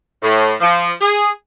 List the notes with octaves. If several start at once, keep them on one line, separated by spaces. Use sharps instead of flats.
A2
F3
G#4